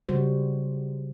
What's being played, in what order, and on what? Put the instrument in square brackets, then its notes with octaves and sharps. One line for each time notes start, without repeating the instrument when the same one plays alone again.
[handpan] C#3 G3 F#4 C5